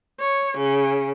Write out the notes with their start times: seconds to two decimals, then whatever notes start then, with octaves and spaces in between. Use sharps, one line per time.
0.19 C#5
0.56 C#3